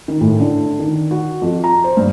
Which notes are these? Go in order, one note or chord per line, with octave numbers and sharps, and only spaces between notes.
D#3
A2
D3
D#3
F#4
F2
A#5
C5
G2